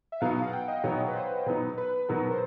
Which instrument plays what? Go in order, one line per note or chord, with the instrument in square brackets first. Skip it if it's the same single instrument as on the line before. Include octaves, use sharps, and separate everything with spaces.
[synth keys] E5
[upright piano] B2 F#3 B3 D#4 [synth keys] F5
[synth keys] F5
F#5
G5
D#5
[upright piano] B2 F#3 B3 D#4 [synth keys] C#5
[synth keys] B4
C5
[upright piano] B2 F#3 B3 D#4 [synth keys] B4
[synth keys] B4
[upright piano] B2 F#3 B3 D#4 [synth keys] A#4
[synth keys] C5